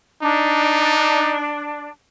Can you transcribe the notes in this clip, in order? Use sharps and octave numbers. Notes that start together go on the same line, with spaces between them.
D4 D#4